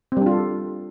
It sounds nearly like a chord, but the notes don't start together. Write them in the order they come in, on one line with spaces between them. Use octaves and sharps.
C4 G3 D4 F4 A4